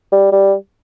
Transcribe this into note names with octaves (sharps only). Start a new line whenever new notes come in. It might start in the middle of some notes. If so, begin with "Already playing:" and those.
G3
G3